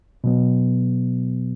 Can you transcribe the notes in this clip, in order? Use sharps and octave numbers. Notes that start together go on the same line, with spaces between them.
B2 F#3 B3